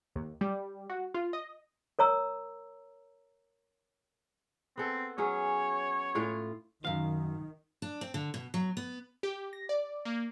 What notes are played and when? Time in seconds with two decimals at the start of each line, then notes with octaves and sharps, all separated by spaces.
0.16 D#2
0.41 G3
0.90 F#4
1.14 F4
1.33 D#5
1.99 A#4 C#5 A#5 E6
4.77 B3 C4 A4
5.18 F#3 C#4 G#4 C#5
6.15 A2 F4 F5
6.85 F#2 D#3 F5
7.82 D4
8.01 C4
8.14 D3
8.34 B2
8.54 F#3
8.77 B3
9.23 G4
9.53 A#6
9.69 D5
10.05 A#3